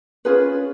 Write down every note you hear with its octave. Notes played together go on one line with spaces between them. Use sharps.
C#4 F4 G#4 B4